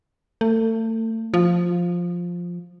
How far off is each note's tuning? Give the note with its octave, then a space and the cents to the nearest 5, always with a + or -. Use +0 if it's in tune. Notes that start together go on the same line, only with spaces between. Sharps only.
A3 +35
F3 +5